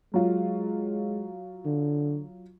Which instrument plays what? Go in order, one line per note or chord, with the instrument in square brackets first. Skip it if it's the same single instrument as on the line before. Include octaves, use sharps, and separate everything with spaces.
[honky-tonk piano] F#3 F4 [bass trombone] G#3
[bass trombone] D3